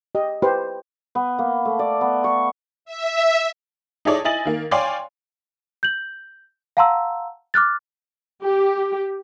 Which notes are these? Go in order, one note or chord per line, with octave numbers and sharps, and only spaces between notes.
G4 D#5
G4 B4 C5
B3
A#3
A3
D5
B3
C#6
E5
D#4 E4 G#4 A4 C#5 D5
E4 D#5 G#5 A6 F#7
D#3 A#3
C#5 D5 F5 G5 G#5 C6
G6 F#7
F5 F#5 A5 A#5 C6 E6
D6 F6 F#6 A6
G4